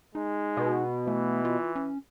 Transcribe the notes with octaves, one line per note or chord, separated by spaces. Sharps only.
G#3 D#4
B2
E3 A3
F4
C#4